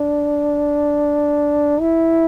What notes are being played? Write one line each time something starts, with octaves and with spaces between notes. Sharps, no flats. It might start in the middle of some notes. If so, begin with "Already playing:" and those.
Already playing: D4
E4